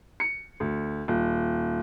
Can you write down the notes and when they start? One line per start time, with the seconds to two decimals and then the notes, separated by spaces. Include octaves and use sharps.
0.20 C#7
0.60 D2
1.08 D#1